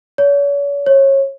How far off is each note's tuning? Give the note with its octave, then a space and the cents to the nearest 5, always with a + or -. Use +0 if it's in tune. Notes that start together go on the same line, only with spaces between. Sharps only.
C#5 +40
C#5 -25